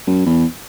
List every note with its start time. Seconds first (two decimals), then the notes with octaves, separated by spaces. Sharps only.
0.07 F#2
0.26 E2